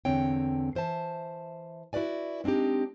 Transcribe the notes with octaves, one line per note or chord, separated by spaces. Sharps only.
E2 D3 C4 C#5 G5
E3 C5 E5 A5
E4 F#4 B4 D5 G#5
G#3 C4 D4 D#4 G4